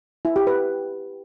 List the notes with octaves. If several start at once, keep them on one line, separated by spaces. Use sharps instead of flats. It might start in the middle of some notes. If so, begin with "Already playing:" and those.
E4
G4
B4